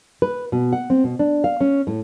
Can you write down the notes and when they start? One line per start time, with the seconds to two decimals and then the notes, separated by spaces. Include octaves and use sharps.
0.22 B4
0.52 B2
0.73 F#5
0.90 C4
1.04 B2
1.19 D4
1.44 F5
1.61 C#4
1.87 A2